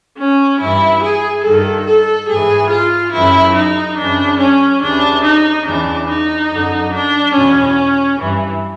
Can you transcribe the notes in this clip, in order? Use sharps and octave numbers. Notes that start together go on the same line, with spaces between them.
C#4
G2 E3 E4
G#4
G2 D#3 A4
A4
G#2 E3 G#4
F4
F#2 C#3 E3 E4
D#4
F#2 C#3 E3 D4
C#4
D#2 C#3 E3 D4
D#4
E2 C#3 E3 D4
D#4
F#2 D3
D4
E2 B2 C#4
G2 E3